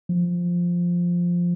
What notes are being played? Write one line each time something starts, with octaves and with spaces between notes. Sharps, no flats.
F3